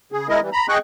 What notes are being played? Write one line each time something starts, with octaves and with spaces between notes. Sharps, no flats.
C#3 G#4
G#3 E4 A#4 D#5
E3 G3
A#5 B5
G#4 D#5 G5 C#6 F#6